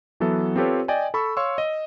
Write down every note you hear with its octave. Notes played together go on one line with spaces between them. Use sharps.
E3 F#3 B3 A4 E5
C4 F4 G4 A4 B4 C#5
D5 D#5 G5 G#5
A4 B5 C#6 E6
C#5 F5 C6 C#6 E6
D#5